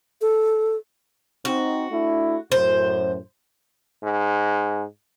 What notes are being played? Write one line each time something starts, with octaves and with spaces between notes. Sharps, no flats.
A4
C4 D#4 F#4
A3 D4 E4
F#2 A2 C5
G#2